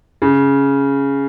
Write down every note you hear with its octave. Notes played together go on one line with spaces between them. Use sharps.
C#3